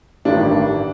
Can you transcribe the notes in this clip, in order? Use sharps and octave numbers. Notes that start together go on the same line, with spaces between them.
A1 G2 D#3 G3 D4